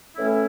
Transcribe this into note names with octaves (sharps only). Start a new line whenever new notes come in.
A2 E3 A3 C#4 E4